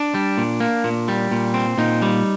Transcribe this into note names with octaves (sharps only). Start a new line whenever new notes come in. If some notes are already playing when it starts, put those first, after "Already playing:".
Already playing: D4
G3
A#2
A#3
A#2
G3
A#2
C4
A#2 D#4
G3